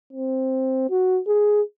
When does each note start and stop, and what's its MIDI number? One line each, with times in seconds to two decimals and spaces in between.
0.13 0.87 60
0.90 1.20 66
1.27 1.62 68